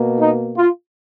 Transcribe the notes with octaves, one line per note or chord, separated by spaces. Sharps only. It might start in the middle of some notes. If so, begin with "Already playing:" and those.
Already playing: B2 A#3
D#4
F4